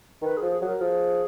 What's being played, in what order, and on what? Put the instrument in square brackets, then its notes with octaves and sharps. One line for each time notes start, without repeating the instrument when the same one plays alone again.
[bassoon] D#3 [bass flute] B4
[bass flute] G#4
[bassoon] F3
[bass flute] G#4
[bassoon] F#3 [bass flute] A#4
[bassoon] F3 [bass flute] G#4